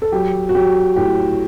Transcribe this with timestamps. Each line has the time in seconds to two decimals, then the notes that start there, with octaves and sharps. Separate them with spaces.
0.02 A4
0.12 F#3 G4
0.49 F#4
0.55 F#3 G4
0.96 A2 G4